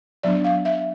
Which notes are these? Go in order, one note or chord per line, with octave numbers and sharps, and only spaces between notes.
F#3 B3 D4 D5
F5
E5